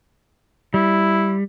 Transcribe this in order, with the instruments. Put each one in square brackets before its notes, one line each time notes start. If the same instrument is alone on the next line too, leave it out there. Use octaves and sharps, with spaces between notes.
[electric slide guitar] G3 [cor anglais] E4